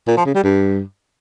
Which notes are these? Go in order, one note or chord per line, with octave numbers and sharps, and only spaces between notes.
A#2
F3
C#3
G3
G2